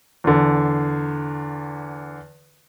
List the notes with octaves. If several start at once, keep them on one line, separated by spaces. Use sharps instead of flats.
E2 D3